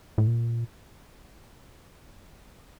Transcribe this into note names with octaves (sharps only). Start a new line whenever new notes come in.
A2
A#2